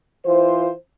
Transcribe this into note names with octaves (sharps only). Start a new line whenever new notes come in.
E3 F4 C5